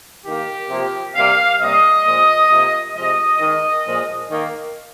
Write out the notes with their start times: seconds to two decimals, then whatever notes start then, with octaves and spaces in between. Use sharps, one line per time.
0.25 D#3 A#3 G4
0.69 C3 F3 A#3
1.14 C3 G3 A#3 F5
1.59 C3 G3 A#3 D#5
2.05 A#2 F3 G#3
2.50 C3 F3 A#3
2.95 C3 F3 G#3 D#5
3.40 D#3 G#3
3.85 A#2 F3 G#3
4.30 D#3 A#3